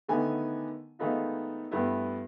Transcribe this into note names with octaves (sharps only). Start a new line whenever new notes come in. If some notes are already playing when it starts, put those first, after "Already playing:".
D3 D#3 A3 B3 G#5
D#3 G#3 A3 B3 D#4 F4
G2 A3 B3 E4